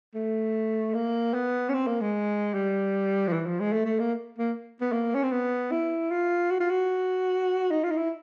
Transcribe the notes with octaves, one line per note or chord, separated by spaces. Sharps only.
A3
A#3
B3
C#4
C4
A#3
G#3
G3
F3
E3
F3
G#3
A3
A3
A#3
A#3
B3
A#3
C#4
C4
B3
E4
F4
F#4
F4
F#4
D#4
F4
D#4
E4